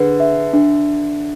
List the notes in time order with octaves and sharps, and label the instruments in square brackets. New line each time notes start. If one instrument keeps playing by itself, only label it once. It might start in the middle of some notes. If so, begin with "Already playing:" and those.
Already playing: [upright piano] D3 [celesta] G#4 B4
[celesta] E5
D4